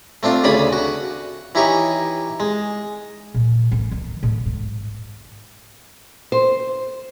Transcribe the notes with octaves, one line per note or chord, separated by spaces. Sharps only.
A3 C4 D4 F4
D2 C#3 D5 G#5 B5 D#6
F#4
E3 D#4 E4 G4 C#5 C#6
G#3
A#2
A1
D#3
A2
G#2
C5